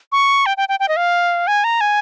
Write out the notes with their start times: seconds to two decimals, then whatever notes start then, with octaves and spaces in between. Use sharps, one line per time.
0.12 C#6
0.46 G5
0.57 G5
0.69 G5
0.80 G5
0.89 D#5
0.97 F5
1.47 G#5
1.64 A#5
1.81 G#5